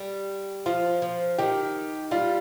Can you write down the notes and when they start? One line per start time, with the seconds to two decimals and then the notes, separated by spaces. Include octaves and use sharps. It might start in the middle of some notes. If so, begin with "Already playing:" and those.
Already playing: G3
0.66 F3 F4
1.02 F3
1.38 D#3 G4
2.11 G3 F4